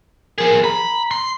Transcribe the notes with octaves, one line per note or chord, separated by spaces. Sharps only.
F3 G#4 A#4
A#5 B5
C6